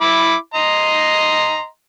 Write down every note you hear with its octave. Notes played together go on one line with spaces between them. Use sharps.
E4 B5 D6
D#5 A#5 C6